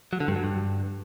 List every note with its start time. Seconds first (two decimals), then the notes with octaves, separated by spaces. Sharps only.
0.13 F#3
0.20 D3
0.28 G2
0.36 F#3
0.44 G2